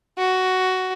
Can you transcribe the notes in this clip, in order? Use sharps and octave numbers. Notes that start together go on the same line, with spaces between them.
F#4